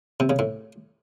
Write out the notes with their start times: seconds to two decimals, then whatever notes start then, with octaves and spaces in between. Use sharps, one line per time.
0.20 C3
0.30 C#3
0.39 A2